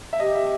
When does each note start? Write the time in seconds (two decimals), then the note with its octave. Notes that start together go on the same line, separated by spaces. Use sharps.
0.13 E5
0.20 G4 D#5
0.35 E5